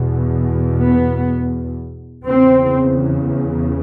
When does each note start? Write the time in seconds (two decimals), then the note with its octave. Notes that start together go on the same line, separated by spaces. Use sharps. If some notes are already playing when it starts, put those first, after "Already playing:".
Already playing: E2 B2
0.84 B3
2.26 E2 C#3 C4